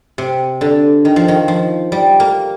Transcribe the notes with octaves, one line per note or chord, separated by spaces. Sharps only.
C3
D3
D#3
F3
D#3
F3
G3
A#3